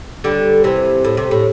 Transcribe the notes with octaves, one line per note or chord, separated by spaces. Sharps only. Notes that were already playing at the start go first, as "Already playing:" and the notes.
D3 G3
C3 E3
A2
C3
A2